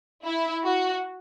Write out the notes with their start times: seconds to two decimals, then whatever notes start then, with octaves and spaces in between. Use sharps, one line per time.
0.24 E4
0.63 F#4